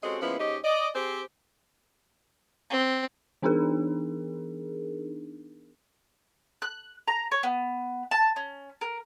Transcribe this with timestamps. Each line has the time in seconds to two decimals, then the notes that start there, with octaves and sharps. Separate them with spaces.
0.03 G#3 C4 C#4 F#4 G4 A4
0.22 F3 G#3 A#3 B3 C#4 E4
0.39 G#2 C#4 D#4 G4 D#5
0.64 D5 D#5
0.95 C4 G4 G#4 C5
2.70 C4
3.42 E3 B3 D4 D#4 G#4 A#4
6.62 F#6
7.08 A#5
7.32 C#5
7.43 B3
8.11 A5
8.36 C#4
8.81 A#4